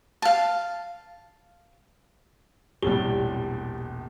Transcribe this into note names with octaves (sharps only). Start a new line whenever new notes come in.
F5 A5
E1 A#1 A2 C3 G3 G4 G7